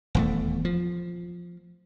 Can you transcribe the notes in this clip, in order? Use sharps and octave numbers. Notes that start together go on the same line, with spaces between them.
D#1 E2 A3
F3